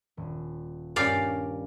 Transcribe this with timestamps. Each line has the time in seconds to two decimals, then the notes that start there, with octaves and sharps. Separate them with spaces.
0.17 D#1
0.96 G2 C#4 G4 A#4 D5 F5 G6